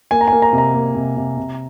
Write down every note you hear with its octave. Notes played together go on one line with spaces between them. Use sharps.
A#3 G#5
A#5
A#3 G#5
A#5
C3
A#5
A#3
C3
C3
C3